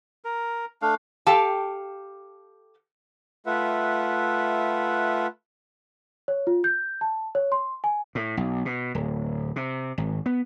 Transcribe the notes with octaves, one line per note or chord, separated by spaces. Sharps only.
A#4
A3 D4 F5
G4 A4 F5 G5 A5
A3 F4 B4 E5 F#5
C#5
F4
G6
A5
C#5
C6
G#5
A2
B1
B2
D1
C3
G#1
B3